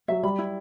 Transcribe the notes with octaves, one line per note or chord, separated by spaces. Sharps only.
F#3 E5
G3 B5
E4